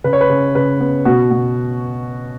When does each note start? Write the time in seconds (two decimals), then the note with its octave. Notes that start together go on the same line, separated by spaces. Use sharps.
0.04 C#3 B4
0.13 C#5
0.21 B4
0.30 C#3
0.55 C#3 B4
0.80 B3
1.05 B2 F#4
1.31 B2